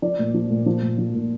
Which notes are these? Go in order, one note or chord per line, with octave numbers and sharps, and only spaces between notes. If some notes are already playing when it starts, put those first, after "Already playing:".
F3 D5
A#2
F3
A#2
F3
A#2
F3
A#2